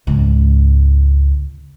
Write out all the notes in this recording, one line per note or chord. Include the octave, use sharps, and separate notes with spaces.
G#1 C#2